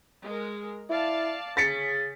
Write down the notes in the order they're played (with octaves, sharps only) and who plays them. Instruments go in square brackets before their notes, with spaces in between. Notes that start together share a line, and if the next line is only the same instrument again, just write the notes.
[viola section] G#3 A#4
[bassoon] E4 [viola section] D5 F5 A5
[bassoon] C#3 [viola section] C#4 G#4 [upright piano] A6 B6 C#7